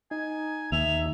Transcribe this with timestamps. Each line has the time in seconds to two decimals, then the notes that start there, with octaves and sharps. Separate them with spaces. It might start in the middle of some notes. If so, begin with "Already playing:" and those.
0.11 D#4 G#5
0.72 D#2 E5 F7